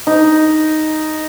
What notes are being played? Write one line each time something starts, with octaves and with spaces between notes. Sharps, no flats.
D#4